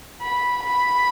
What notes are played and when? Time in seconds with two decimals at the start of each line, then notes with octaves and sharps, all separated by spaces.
0.22 B5
0.64 B5